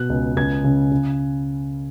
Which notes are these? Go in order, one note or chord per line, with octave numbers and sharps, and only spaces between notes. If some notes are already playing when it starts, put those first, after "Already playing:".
Already playing: B2 F#6
C#2
C#2 G#6
C#3
C#3